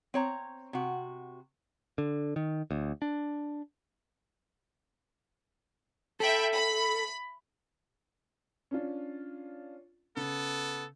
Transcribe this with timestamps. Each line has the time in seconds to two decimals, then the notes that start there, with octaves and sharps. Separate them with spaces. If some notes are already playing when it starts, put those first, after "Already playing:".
0.14 C4 C#5 A#5
0.73 C3 F#4
1.98 D3
2.36 D#3
2.71 D2
3.02 D4
6.20 A4 E5 G5 B5
6.54 B5
8.71 C#4 D4 F4
10.17 C#3 B3 A4